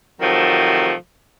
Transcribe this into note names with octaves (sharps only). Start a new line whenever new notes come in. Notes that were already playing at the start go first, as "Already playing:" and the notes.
C3 D#3 F3 F#3 A3